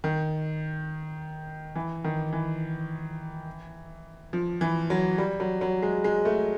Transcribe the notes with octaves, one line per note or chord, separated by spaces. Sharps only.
D#3
E3
D#3
E3
F3
E3
F#3
G3
F#3
F#3
G#3
G#3
A3